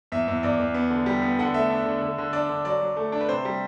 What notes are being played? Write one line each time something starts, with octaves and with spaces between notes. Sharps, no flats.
E2 E5
E2
E2 D5
E2
B3
D3
G3
B3
D3 F#5
A3 E5
D4
D3
D3
D3
D4 D5
D3
F#3 D5
F#3
A3
D4
B4
C3 C5
G3